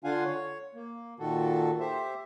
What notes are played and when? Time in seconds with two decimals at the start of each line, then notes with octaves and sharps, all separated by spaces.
0.04 D3 D4 F4 F5 F#5 G#5
0.25 C#5
0.75 A#3
1.19 A#2 D#3 F#4 A4
1.80 G4 C5 E5